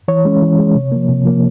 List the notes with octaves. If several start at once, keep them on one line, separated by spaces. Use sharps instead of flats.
E3 C#5
G#3 C#4
E3
G#3 C#4
C3
F3 A#3
C3
F3 A#3